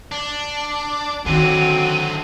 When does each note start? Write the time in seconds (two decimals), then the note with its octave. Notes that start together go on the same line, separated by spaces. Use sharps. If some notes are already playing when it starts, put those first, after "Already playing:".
0.12 D4
1.26 D3 D#3 F#3 C4 F#4 D#7